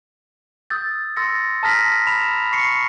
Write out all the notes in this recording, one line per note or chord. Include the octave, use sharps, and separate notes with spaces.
D#6 E6 G6 A6
C6 E6 A6 A#6 C#7
A5 A#5 D#6 F6 A#6 B6
B5 B6 E7 F7
C#6 C7 C#7